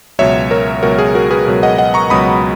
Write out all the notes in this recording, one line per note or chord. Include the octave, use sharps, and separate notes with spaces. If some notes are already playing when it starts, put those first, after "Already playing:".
C#2 B2 F#3 C#5 E5
A#4 C#5
C#2 B2 F#3 F#4 A#4
G#4
F#4 A#4
G#4 B4
C#2 B2 F#3
D#5 F#5
D#5 F#5
A#5 C#6
C#2 B2 F#3 B5 D#6